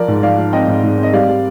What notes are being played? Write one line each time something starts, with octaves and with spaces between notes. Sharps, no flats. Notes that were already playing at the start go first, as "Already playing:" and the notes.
Already playing: F3 A#4 D5
G#2
F3 D5 F5
F3
C4 D#5 G5
G#2
G#2
C4
D#5
G3 D5 F5
G3